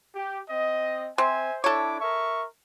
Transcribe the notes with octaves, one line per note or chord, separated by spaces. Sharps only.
G4
C4 D#5
C4 C5 E5 G#5
D4 E4 A4 C#5 D6
A#4 E5 C#6